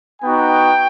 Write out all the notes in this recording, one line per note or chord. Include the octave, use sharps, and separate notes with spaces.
B3 D#4 F#4 G5